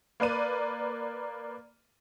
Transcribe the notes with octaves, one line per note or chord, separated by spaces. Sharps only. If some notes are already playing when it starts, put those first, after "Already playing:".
A#3 B4 D5 D#7